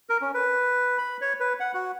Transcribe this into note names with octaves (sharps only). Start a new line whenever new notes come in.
A#4
C#4
B4
B5
C#5
B4
F#5
F#4